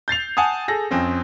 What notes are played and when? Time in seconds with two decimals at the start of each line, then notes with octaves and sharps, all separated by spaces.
0.08 G6 A6 C7 F7
0.37 F#5 G#5 A5 D#6
0.68 G#4 A4 A#6
0.91 F2 C4 C#4